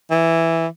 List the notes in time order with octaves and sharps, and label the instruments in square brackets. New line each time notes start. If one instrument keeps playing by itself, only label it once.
[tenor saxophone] E3